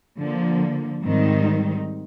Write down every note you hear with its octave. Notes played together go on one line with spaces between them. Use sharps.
D3 F3 A#3
G#2 D#3 G3 C4 D#4